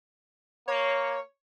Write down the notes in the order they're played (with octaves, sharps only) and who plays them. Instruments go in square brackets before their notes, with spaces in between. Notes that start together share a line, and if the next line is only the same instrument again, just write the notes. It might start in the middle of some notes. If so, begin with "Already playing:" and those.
[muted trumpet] A#3 [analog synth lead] C#5